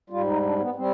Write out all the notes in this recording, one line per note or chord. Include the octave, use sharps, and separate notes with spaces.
G#2 G3 F4
D#4
D4
B3
G3 C4